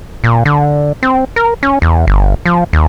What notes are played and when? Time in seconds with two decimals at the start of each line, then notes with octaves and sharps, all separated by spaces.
0.24 A#2
0.45 D3
1.03 C4
1.36 A#4
1.63 C#4
1.82 E2
2.07 G1
2.46 F3
2.73 D#2